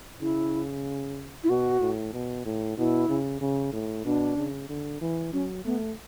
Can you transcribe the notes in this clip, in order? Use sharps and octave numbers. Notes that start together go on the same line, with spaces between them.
C#3 E4
E4
B2 F#4
A2
B2
A2
B2 E4
C#3
C#3
A2
B2 D4
C#3
D3
E3
F#3 C#4
A3 B3